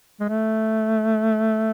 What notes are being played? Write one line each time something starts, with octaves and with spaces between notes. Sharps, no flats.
G#3
A3